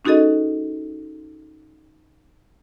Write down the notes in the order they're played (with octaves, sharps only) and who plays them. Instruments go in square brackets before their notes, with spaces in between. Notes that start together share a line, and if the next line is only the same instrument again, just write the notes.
[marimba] C#4 D#4 F#4 G#4 A4 D#5